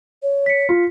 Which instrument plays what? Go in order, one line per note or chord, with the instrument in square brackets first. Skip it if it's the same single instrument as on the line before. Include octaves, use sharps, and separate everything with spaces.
[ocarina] C#5
[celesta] B6 C#7
[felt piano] F4